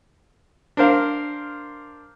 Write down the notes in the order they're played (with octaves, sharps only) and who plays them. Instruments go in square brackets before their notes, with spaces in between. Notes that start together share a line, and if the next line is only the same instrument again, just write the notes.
[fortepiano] D4 A#4 C5 F5